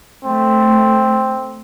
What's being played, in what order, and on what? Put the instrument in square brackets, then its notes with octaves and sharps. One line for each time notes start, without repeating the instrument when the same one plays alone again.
[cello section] A3 [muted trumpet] C4